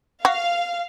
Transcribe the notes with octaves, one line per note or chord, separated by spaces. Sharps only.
F#4 F5